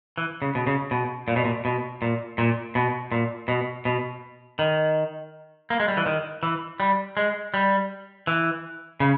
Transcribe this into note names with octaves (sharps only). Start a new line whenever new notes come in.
E3
C#3
B2
C#3
B2
A#2
B2
A#2
B2
A#2
A#2
B2
A#2
B2
B2
D#3
A#3
G#3
G3
E3
D#3
E3
G3
G#3
G3
E3
C#3